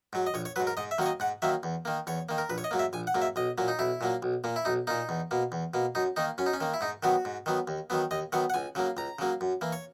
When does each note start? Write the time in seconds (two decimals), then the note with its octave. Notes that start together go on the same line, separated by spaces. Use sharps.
0.13 G#2 F#3
0.27 D#5
0.34 A#1 C#5
0.45 C#5
0.56 G#2 F#3 B4
0.67 A#4
0.77 G#2 D#5
0.91 E5
0.98 D#3 F#3 A#3 C#5
1.06 D#5
1.20 G#2 F#5
1.42 D#3 F#3 A#3 E5
1.63 E2
1.85 D#3 A#3
2.07 E2 C#5
2.29 D#3 A#3
2.38 A#4
2.50 A#1 B4
2.58 C#5
2.64 D#5
2.71 G#2 F#3 A#3
2.79 E5
2.93 A#1 G#5
3.07 F#5
3.15 G#2 F#3 A#3
3.22 E5
3.36 B1 D#5
3.58 A#2 F#3 A#3
3.68 D#4
3.79 B1 E4
4.01 A#2 F#3 A#3
4.23 B1
4.44 A#2 A#3
4.56 E4
4.65 B1 D#4
4.87 A#2 A#3 D#4
5.09 E2
5.31 B2 A#3
5.52 E2
5.74 B2 A#3
5.95 F#2 D#4
6.16 D#3 A#3 D#4
6.38 F#2 C#4
6.46 D#4
6.53 C#4
6.61 D#3 A#3
6.74 E4
6.81 G#2 D#4
7.03 D#3 F#3 B3 F#4
7.25 G#2
7.46 D#3 F#3 B3
7.68 D#2
7.90 D#3 F#3 B3
8.11 D#2 D#5
8.32 D#3 F#3 B3 F#5
8.50 F#5
8.54 C#2 G#5
8.75 C#3 F#3 A#3
8.97 C#2 A#5
9.19 C#3 F#3 A#3
9.41 F#2
9.61 E3 A#3
9.73 C#5